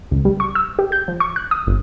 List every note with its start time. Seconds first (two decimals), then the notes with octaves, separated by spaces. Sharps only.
0.11 C#2
0.25 G3
0.40 C#6
0.55 E6
0.79 G4
0.92 G6
1.08 F3
1.20 C#6
1.36 F#6
1.51 D#6
1.66 G1